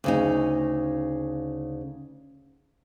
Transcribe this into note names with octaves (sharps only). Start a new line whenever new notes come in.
D2 C#3 D#4